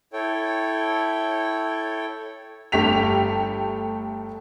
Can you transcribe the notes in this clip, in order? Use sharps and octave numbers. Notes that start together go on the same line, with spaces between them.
E4 A4 C#5 G5
G1 A3 G4 B6 F7